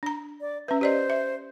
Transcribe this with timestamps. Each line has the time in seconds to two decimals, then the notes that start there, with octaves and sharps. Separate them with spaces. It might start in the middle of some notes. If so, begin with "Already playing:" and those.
0.03 D4 A#5
0.41 D5
0.68 C#4 B4 E5
0.81 G4 C5 D5 D#5
1.10 E5